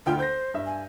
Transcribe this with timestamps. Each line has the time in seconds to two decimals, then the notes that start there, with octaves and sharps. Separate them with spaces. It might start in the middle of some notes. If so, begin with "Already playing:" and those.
0.06 D2 F4 G5
0.19 C5 G6 A#6
0.54 G2 E5
0.66 G#5